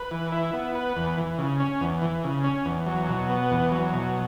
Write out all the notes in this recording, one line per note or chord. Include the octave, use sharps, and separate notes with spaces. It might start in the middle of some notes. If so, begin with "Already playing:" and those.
Already playing: B4
E3
E4
B3
B4
E2
E3
C#3
C#4
E2
E3
C#3
C#4
E2
F#3
B2
B3
E2
F#3
B2